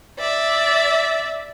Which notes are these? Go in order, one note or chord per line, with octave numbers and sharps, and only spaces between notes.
D5 E5